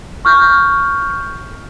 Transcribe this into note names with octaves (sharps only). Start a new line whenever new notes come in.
C#6 F6 G6